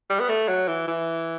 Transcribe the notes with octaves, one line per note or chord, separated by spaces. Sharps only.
G3
B3
A3
F#3
E3
E3